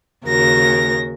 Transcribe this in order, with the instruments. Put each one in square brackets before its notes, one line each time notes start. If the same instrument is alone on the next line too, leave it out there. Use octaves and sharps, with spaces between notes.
[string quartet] D#2 C#3 F#4 A#4 A#6